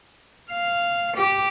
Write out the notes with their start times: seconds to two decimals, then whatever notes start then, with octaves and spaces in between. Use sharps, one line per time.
0.51 F5
1.16 G4